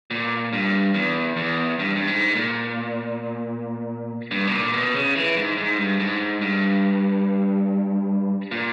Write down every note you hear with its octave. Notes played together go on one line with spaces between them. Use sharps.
A#2
G2
E2
E2
G2
G2
G#2
A#2
G2
B2
A#2
B2
C#3
E3
G#2
G#2
G2
G#2
G2
A#2